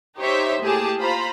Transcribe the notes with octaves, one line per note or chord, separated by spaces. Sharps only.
D#4 G4 C5 C#5 E5
A2 A#3 G4 G#4 A5
F4 C5 A#5 B5